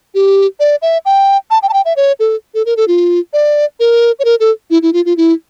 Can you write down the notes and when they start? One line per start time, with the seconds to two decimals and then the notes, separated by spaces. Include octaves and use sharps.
0.14 G4
0.60 D5
0.82 E5
1.05 G5
1.50 A5
1.63 G5
1.69 A5
1.73 G5
1.85 E5
1.96 C#5
2.20 A4
2.54 A4
2.66 A#4
2.77 A4
2.88 F4
3.33 D5
3.80 A#4
4.19 C#5
4.25 A#4
4.40 A4
4.70 E4
4.82 E4
4.93 F4
5.05 F4
5.17 E4